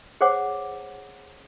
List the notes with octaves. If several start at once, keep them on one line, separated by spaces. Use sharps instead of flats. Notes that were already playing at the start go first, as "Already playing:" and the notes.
G#4 C5 C#5 F#5 D6